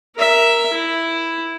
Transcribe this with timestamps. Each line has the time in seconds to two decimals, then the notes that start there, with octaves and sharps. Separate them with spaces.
0.16 A#4 E5
0.73 E4